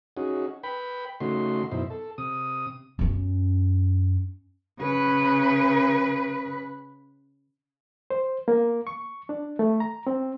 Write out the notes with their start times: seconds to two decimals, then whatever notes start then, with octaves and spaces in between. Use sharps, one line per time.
0.17 C#4 D#4 F#4 G#4
0.63 B4 G5 B5
1.20 C#3 A3 D#4 F#4 C6
1.71 F#2 B2 D#4 E4 C5
1.90 A4
2.18 C3 D#6
2.99 F#2 C#4
4.79 C#3 B4
8.10 C5
8.48 A#3
8.87 C#6
9.29 D4
9.59 A3
9.80 A#5
10.07 C4